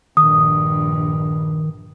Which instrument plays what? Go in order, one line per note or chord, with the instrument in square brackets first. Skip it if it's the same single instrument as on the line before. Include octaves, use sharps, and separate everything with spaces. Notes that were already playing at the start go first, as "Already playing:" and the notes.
[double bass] A#1 G2 [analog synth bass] D#3 [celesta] D#6